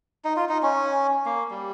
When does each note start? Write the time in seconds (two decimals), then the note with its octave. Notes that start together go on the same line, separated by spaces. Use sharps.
0.25 D#4
0.36 F4
0.49 D#4
0.63 C#4
1.26 A#3
1.51 G3